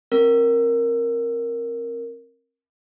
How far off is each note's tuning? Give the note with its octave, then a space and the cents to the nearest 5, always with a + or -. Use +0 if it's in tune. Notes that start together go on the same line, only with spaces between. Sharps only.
C4 +30 A#4 +0